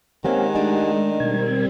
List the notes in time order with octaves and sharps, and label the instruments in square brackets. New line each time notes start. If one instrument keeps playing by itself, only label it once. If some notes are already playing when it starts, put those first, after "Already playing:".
[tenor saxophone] D#3 [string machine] G#3 [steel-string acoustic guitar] A#3 C4 C#4 [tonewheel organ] G4 F#5 G#5
[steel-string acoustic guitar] A3 D4 D#4
[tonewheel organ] B2 A#4 G#6 [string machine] G3 C4